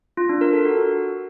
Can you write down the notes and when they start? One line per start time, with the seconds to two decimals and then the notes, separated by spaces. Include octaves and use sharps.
0.17 F4
0.29 D4
0.41 A#4
0.53 A4
0.65 F#4